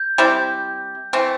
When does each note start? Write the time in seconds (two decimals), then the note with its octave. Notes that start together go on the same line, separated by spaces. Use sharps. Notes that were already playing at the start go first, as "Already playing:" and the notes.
Already playing: G6
0.18 G3 C4 E4 G4
1.13 E3 A3 C4